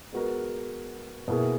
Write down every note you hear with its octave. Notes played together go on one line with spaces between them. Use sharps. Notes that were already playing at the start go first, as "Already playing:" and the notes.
G#3 B3 F#4 A#4
B2 A#3 E4 G#4